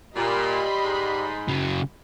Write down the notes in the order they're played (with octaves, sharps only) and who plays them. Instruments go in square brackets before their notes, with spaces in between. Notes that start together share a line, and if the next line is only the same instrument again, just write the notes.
[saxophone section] A#2 [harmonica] G3 [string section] D#5 B5 C6
[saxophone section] G#2
[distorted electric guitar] C#3 F#3